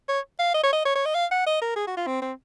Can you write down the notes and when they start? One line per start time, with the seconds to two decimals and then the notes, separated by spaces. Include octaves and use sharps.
0.09 C#5
0.39 F5
0.54 D#5
0.63 C#5
0.73 D#5
0.85 C#5
0.95 C#5
1.05 D#5
1.15 F5
1.31 F#5
1.46 D#5
1.61 A#4
1.76 G#4
1.87 F#4
1.97 F4
2.07 C4
2.22 C4